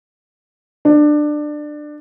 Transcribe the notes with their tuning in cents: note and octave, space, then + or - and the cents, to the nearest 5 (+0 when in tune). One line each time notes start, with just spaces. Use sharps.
D4 +20